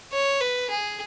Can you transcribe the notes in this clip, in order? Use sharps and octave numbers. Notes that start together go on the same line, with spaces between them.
C#5
B4
G#4